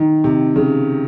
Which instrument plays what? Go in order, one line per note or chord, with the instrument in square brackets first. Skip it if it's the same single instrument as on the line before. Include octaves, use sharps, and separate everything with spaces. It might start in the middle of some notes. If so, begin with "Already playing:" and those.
Already playing: [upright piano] D#3
C3
C#3